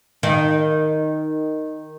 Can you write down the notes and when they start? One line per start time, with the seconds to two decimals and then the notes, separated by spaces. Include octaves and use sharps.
0.23 D#3